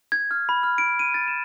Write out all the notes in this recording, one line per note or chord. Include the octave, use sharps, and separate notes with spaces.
G#6
F6
B5
F6
D7
D#7
A6
E7